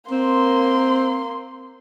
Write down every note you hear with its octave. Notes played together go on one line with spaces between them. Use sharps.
A#3 C4 C6